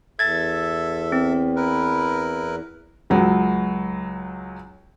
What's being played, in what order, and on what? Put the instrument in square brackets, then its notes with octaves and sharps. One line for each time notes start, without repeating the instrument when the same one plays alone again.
[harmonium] E2 [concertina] A4 E5 [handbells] G#6 A6
[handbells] C4
[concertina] E4 A#4 B4
[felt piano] C#2 F#3